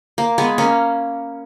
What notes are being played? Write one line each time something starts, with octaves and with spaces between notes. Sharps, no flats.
A#3
G#3 B3
A#3 C#4